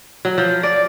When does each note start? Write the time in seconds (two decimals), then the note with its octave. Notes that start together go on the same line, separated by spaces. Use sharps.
0.25 F#3
0.38 F3
0.63 D5